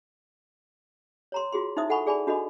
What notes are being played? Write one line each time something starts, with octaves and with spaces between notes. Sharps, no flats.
C#5 A#5 C6
F4 F#4 G#4 C6
D#4 E4 C5 E5 D#6
A4 F#5 G#5 B5 C#6
G#4 D5 G#5 A5 B5
D4 F#4 A4 D#5 B5